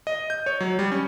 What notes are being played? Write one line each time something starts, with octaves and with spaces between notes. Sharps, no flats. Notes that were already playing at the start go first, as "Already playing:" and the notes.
D#5
G6
C#5
F#3
G3
C#4